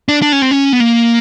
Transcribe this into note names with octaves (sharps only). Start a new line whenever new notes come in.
D4
D4
C#4
C4
C#4
B3
A#3